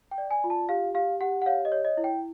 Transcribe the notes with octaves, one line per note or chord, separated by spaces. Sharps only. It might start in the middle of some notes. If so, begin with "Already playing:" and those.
G5
D5
G#5
F4
A5
G4 F5
G4 F5
G4 F#5
F#5
C#5 F5
D#5
C#5
D#5
E4
G5